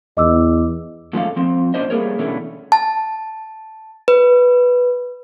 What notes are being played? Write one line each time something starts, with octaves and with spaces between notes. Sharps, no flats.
E2 D#5 D6 E6
A2 F3 G#3 C#4 A4 F5
F3 C4
A#2 C#4 D4 C5 D#5
G3 A3 A#3 G#4 A#4 C#5
B2 D3 E3 A3 C#4
A5
B4